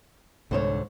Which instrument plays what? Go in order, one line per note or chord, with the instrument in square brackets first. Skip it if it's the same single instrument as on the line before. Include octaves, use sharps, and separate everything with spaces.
[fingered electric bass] C2 G#2 [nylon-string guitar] D3 C5 C#5